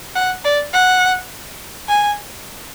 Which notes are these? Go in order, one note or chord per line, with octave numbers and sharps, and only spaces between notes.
F#5
D5
F#5
G#5